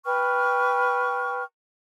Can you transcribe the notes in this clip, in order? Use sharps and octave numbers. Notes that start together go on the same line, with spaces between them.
B4 G5 C#6 F6